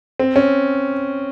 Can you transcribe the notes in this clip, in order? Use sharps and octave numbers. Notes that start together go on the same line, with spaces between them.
C4
C#4